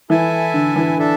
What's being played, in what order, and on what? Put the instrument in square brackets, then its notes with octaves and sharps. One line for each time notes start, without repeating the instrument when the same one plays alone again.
[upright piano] E3 [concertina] E4 A4 E5 G#5
[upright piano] D3
E3
[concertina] D4 A4 E5